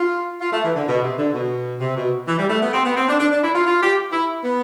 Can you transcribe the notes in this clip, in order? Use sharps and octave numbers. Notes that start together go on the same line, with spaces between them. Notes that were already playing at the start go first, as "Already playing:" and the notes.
Already playing: F4
F4
A3
E3
D3
B2
C3
D3
B2
C3
B2
E3
G3
A3
B3
C4
B3
C4
D4
D4
D4
E4
F4
F4
G4
E4
B3